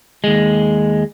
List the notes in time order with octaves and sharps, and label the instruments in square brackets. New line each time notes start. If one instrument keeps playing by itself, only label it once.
[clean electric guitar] D#2 G#3